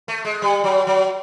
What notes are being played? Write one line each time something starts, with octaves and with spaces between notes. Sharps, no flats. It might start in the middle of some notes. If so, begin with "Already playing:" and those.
A3
G#3
G3
F#3
F#3